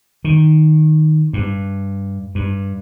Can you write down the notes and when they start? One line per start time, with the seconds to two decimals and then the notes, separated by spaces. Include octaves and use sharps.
0.24 D#3
1.33 G2
2.35 G2